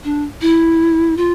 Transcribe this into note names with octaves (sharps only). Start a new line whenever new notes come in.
D4
E4
F4